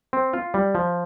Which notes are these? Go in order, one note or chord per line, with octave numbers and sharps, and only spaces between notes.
C4
F4
G3
F3